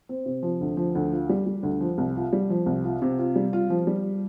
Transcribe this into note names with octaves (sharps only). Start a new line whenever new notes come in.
C4
C3
F3
D2
F3
D2
F4
G3
G3
D2
F3
C2
F4
G3
F3
C2
F4
C3
F4
G3
F4
F3
G3